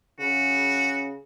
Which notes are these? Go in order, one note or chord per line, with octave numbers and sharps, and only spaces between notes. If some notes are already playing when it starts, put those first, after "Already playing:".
C#3 F#4